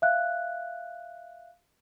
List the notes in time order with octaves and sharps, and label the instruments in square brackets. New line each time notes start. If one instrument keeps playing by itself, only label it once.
[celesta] E5 F5 F#6